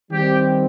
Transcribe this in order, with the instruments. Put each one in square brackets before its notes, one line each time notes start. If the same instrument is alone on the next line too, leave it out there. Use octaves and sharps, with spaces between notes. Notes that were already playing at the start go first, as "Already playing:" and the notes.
[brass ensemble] D#3 G3 C4 G4